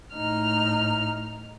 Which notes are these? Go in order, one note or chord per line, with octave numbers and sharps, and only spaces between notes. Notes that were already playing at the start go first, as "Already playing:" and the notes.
A2 D#4 F6